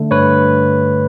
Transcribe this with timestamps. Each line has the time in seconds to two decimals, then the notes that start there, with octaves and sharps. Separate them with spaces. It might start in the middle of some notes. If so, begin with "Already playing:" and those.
Already playing: D3 A3
0.11 G2 B4 C#5